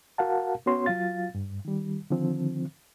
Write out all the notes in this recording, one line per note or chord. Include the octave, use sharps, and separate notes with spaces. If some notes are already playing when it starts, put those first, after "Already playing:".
F#4 A#4 F5 F#5 A5
B3 C#4 F#4 C#5 C6
F#3 F4 F5 A6
G2
D#3 G3
D3 D#3 F3 C4